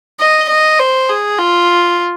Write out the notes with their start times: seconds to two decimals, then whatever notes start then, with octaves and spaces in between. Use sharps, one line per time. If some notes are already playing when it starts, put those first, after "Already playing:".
0.20 D#5
0.50 D#5
0.79 C5
1.09 G#4
1.39 F4